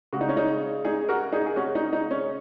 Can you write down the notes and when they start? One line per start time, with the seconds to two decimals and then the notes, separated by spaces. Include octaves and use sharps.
0.13 C#3 G#3 F#4
0.21 D#4
0.29 C#4
0.37 D#4
0.85 D#4 G#4
1.09 F#4 A#4
1.32 D#4 G#4
1.46 G#4
1.56 C#4 F#4
1.75 D#4
1.93 D#4
2.11 C#4